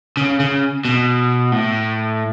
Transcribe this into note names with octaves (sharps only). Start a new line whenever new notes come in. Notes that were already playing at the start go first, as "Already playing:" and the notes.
C#3
C#3
B2
A2